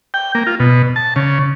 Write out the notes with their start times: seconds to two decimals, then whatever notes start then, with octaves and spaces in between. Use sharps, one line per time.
0.14 G5
0.35 A#3
0.47 F4
0.60 B2
0.96 A5
1.16 C#3